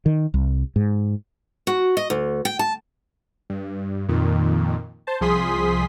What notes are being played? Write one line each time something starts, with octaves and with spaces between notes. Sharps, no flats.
D#3
C2
G#2
F#4
D#5
D2
G5
A5
G2
F2 A#2 D#3
C5 A5
C2 F3 G#4 C6 D#6 B6